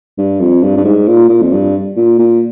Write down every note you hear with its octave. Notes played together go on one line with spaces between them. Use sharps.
G2
F2
G2
G2
G#2
A#2
A#2
F2
G2
A#2
A#2